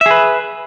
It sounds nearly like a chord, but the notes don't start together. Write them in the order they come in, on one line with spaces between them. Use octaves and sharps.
E5 G#4 B4